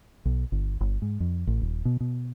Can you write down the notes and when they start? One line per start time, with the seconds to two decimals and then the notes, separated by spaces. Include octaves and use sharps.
0.25 B1
0.52 G1
0.81 G1
1.02 G#2
1.20 F2
1.47 A1
1.61 D#1
1.85 B2
2.00 B2